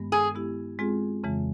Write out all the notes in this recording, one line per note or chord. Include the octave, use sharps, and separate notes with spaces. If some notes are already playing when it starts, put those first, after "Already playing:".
Already playing: G2 D#3 G#3 B3
G#4
G#3 B3 E4 G4
G#3 C4 F4 G#4
F2 C#3 E3 G#3